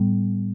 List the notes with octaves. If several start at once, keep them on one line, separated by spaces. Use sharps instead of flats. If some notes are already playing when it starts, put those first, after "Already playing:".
Already playing: A2 G3 B3